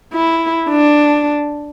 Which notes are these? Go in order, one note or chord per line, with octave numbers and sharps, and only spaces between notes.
E4
D4